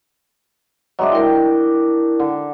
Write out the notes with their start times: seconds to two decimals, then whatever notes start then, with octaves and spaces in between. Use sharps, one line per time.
0.99 F#3 G#3 D4 D#5 E5
1.12 E4 A#4 G5
2.19 D3